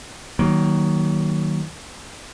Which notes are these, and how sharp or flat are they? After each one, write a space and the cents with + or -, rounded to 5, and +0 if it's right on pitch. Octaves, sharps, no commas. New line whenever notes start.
D#3 +0 F#3 +15 A#3 +0